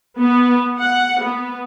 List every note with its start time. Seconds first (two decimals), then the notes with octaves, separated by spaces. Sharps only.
0.19 B3
0.81 F#5
1.24 B3